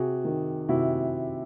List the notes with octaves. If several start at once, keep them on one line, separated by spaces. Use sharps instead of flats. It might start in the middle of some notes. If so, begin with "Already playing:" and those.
Already playing: C3 F#4 G#4
D#3
C3 E4 F#4